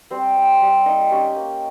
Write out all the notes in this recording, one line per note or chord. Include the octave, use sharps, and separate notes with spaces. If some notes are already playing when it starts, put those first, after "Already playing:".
G3 C4 C5
C4
G3
A#3 D#4 D#5
C#4 G4 G5
A#3